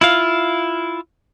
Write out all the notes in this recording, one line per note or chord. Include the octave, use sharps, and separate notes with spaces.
E4 F4 F5